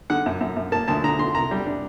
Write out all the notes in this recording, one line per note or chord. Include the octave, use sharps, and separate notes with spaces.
D3 F#5
F#2
F#2
F#2
A#3 A5
D2 A5
D3 A#5
D3 C6
C2 A#5
G3
D4